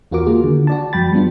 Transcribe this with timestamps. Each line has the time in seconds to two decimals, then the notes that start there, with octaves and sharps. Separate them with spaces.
0.11 E2 F4 F#4 A#4 D6
0.26 D#3 A#3 F4 G#4
0.44 D3
0.67 F#4 D5 A5
0.93 F#2 F3 G5 B5 A6
1.12 F#3 G3 B3 D4 F4